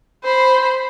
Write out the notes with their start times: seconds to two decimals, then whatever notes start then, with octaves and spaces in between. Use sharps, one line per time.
0.24 C5 B5